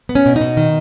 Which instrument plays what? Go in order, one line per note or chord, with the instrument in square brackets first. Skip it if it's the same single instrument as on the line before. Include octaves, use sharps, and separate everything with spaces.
[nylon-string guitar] B3
C#4
B2
B2 D#4
D#3